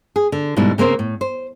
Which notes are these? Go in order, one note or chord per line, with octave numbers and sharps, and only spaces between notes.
G#4
D3
G#2 B2 D3 G3 E4
C#3 A#3 C4 C5
A2
C5